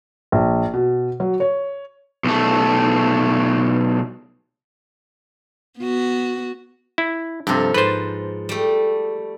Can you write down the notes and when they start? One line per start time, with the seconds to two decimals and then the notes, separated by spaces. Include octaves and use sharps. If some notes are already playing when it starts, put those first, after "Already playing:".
0.32 A#1
0.73 B2
1.20 F#3
1.40 C#5
2.24 B1 A3
5.79 B3 F#4
6.98 E4
7.47 G2 C3 F3 A4
7.74 G#2 B4 C5 A5
8.49 G3 A3